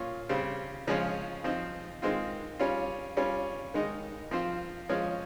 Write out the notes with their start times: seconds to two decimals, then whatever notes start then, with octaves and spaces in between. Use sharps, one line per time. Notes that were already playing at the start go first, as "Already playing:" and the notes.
Already playing: A#2 C#4 F4
0.29 C#3 G3 C4
0.87 C#3 F3 G#3 C#4 F4
1.44 F3 C4 D#4
2.02 D#3 G#3 C4 F4
2.59 G3 C#4 F4
3.17 G3 C#4 F4
3.74 D#3 G#3 D#4
4.31 F3 C4 F4
4.89 F3 G#3 C#4 F4